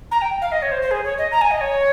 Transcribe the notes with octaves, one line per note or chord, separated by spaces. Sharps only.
A#5
G5
F5
D#5
C#5
C5
C5
G#4
C#5
D#5
A#5
G#5
D#5
C#5